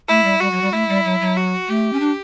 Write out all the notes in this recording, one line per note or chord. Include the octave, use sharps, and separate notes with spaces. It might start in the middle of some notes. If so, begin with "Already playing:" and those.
A3 E4
G3
G3 F#4
F#3
G3
A3 E4
G3
F#3
F#3
F#4
A3 G4
C#4
D4